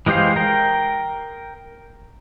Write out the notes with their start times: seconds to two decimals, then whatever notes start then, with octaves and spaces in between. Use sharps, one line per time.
0.06 E3 G#3 G4 C5 F5
0.36 A#4 G5